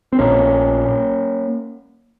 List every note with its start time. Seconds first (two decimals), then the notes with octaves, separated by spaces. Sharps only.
0.13 C4
0.19 A#1 A#2 A#3 C#4